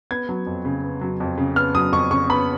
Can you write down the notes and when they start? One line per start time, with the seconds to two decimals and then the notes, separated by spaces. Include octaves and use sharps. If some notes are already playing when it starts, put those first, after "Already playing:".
0.11 B3 G#6
0.29 F#3
0.47 F2
0.65 C#3
0.83 B3
1.01 F#3
1.20 F2
1.38 C#3
1.56 B3 F6
1.75 F#3 D#6
1.93 F2 C#6
2.11 C#3 C#6
2.29 B3 B5